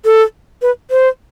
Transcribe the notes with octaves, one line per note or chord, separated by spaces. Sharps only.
A4
B4
C5